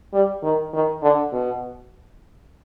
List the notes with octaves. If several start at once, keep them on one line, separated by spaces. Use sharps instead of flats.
G3
D#3
D#3
D3
B2